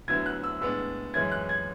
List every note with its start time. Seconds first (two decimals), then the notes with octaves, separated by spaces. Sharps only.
0.08 D2 D3 F#3 B3 E4 G#6
0.26 F#6
0.44 E6
0.61 A2 G#3 B3 D4 E6
1.14 F#2 E3 G#3 C#4 E4 G#6
1.31 F#6
1.49 G#6